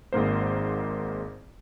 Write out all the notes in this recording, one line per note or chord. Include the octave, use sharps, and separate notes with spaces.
G#1 G#2 A#3 C5